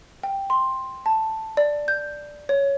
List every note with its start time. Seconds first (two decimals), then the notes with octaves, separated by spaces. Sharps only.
0.23 G5
0.50 C6
1.06 A5
1.57 D5
1.88 G6
2.49 C#5